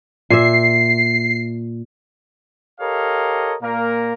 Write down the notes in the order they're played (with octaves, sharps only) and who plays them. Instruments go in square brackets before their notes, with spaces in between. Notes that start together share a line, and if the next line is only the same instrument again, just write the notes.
[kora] A#2 E5 [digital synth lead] C7
[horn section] G4 A4 A#4 C#5 D#5 F5
A#2 A#3 A#4